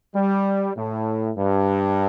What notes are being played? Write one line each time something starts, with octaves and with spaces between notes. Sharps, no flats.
G3
A2
G2